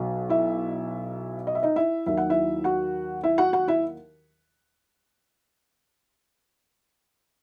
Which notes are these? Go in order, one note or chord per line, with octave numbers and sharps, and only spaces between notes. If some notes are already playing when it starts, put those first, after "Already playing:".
Already playing: B1 B2 F#3
E4 E5
D#5
E5
D#4 D#5
E4 E5
D#2 D#3 F#3 E5
F#5
E4 E5
F#4 F#5
E4 E5
F#4 F#5
F#4 F#5
E4 E5